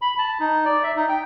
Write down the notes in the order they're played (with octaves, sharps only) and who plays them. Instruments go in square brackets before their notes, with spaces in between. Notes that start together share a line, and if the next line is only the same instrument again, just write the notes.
[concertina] B5
A5
D#4
D5
E5
D#4
G5